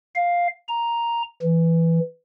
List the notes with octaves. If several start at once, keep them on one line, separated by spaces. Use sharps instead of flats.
F5
A#5
E3